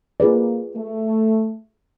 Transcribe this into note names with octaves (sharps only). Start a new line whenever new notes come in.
A#3 F4 G#4 B4 D5
A3